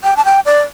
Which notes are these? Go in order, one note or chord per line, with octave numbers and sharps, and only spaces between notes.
G5
A5
G5
D5